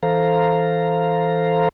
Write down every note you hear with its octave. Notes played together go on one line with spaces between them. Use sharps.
E3 A4 C5 F5 A#5